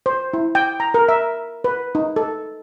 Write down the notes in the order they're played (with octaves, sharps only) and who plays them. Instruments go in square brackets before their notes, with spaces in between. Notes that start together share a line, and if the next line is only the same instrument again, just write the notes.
[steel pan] C5
E4
G5
A#5
A#4
E5
B4
D#4
A4